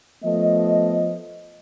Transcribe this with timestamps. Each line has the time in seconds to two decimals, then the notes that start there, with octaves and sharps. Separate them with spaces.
0.24 F3 A3 B3 D#5